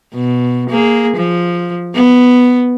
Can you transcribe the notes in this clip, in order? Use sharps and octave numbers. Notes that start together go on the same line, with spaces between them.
B2
A#3 G#4
F3
B3